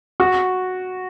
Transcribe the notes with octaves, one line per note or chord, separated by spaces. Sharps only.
F#4